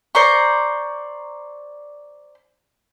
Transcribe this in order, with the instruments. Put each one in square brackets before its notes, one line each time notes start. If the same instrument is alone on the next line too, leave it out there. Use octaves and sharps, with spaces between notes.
[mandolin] C5 D5 A#5 C#6